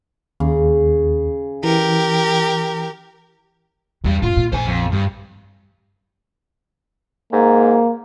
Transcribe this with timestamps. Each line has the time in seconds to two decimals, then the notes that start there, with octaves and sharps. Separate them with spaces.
0.40 D#2 C#3
1.64 E3 G4 A#4
4.04 E2 G2 G3
4.22 F#2 A2 F4
4.37 A#2
4.52 A#1 C5 G#5
4.67 F2
4.92 G2
7.32 G#2 A#3